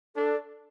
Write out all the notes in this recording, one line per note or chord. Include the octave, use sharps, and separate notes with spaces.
D4 A4